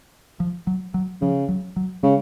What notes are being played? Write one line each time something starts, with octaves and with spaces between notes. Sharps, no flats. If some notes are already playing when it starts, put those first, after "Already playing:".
F3
F#3
F#3
C#3 F3
F#3
F#3
C#3 G#3